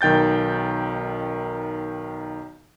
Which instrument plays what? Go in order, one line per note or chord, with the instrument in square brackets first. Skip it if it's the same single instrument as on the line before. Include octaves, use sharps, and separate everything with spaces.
[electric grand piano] B1 D#3 G5 G6 A6